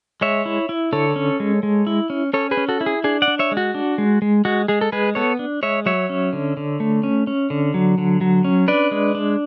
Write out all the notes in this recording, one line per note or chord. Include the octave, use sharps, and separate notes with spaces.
G#3 C#5 E5
E4
E4
D3 A4 C#5
C#4
G#3
G#3
E4
C#4
C#4 A4 C#5
G#4 B4
C#4
F#4 A4
E4
G#4
D4 G#4
D5 F#5
D4
C#5 E5
G#3
F#4
D4
G#3
G#3
G#3 F#4
G#3 G#4
A4
G#3 G#4 B4
B3 A4 C#5
D4
G#3 C#5 E5
F#3 C#5 E5
C#4
D3
D3
A3
C#4
C#4
D3
F#3
D3
F#3
C#4
D4 B4 D5
G#3
D4